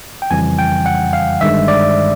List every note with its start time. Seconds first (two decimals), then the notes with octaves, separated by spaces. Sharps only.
0.22 G5
0.31 F2 C#3 E3 G3 G#5
0.59 G5
0.86 F#5
1.13 F5
1.41 G1 G2 D#3 G#3 E5
1.68 D5